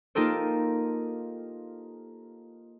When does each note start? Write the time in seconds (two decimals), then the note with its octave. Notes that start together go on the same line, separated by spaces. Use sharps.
0.15 A#3 D#4 F4 G4 A4 C5